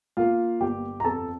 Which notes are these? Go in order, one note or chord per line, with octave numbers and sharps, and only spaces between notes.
A#3 F4 F5
G1 G4 G5
A#5
F2 A4 A5